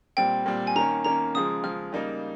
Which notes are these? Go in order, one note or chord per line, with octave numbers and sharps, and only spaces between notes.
A#2 G3 C4 G5
A#2 G3 C4
G#5
D#3 A#3 C#4 A#5
D#3 A#3 C#4 A#5
C#3 F3 G#3 D#6
C#3 F3 G#3 F6
C#3 G3 A#3 D#4